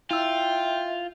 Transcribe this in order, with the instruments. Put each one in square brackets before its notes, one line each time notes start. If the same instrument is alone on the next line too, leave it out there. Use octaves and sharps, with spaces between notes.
[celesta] E4 E6 [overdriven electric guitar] F4 [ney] E5 [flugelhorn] G5